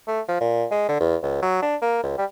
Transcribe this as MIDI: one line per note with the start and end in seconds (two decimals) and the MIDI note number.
0.08 0.21 57
0.28 0.40 53
0.41 0.66 46
0.71 0.85 56
0.89 0.97 50
1.00 1.16 40
1.23 1.39 37
1.42 1.59 54
1.62 1.76 62
1.82 1.98 58
2.03 2.16 37
2.18 2.25 55